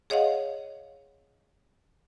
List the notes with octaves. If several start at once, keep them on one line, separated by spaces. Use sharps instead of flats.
G#4 C#5 D#5 F5 F#5